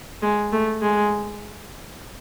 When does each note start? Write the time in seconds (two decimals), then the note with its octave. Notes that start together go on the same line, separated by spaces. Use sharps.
0.22 G#3
0.53 A3
0.82 G#3